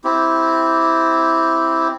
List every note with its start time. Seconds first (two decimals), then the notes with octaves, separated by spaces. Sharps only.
0.04 C4 E4 G4